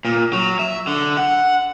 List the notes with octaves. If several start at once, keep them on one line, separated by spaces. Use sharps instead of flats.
A#2
F#3
E5
D3
F#5